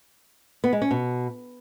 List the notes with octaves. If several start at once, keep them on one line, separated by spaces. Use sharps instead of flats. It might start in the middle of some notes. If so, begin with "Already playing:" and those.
B3
G#3
C#4
B2